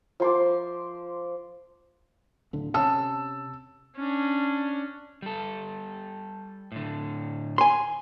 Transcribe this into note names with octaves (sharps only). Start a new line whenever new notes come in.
F3 C6 D6
D1 D3
C3 C#4 A5 E6
C#4 D4
G3 A4
A2 D3
G#5 C6